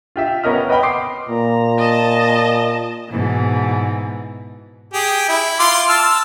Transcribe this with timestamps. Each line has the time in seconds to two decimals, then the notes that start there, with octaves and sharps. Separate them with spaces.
0.16 F4 G4 E5
0.44 B3 C#4 A#4 D#5 F6
0.69 B4 D#5 F#5 G5 B5
0.83 C6 D6 D#6 C7
1.29 A#2 A#5
1.78 D#5 A5
3.10 G#2 B2 E3
4.94 G4 G#4
5.28 E4
5.59 F4 C6 D6
5.89 A5 E6 F6